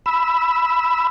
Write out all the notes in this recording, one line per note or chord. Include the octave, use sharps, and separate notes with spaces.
B5 E6